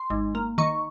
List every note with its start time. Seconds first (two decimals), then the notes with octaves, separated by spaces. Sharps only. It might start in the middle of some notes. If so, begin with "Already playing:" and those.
Already playing: C6
0.10 G#1
0.35 A#3
0.58 D#3 C#6